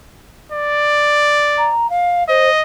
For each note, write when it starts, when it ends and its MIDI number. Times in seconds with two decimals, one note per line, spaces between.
0.52 1.73 74
1.57 1.89 82
1.90 2.23 77
2.28 2.49 72
2.28 2.62 75